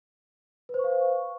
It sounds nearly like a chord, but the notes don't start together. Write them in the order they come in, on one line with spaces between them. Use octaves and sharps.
B4 C5 C#6 F5